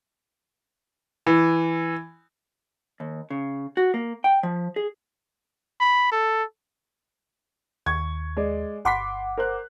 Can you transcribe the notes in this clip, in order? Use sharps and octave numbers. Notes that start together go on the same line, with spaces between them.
E3
D#2
C#3
F#4
A#3
G5
F3
G#4
B5
A4
D#2 C#6 G#6
G#3 D5
G1 F#5 B5 C6 D6 B6
A#4 C5 F#6